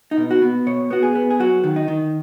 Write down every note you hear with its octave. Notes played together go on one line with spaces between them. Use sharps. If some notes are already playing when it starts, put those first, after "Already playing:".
D#4
B2
F#4
B3
B2 C#5
B3 F#4
G#4
B3
G#4
F#3 F#4
D#3
D#4
D#3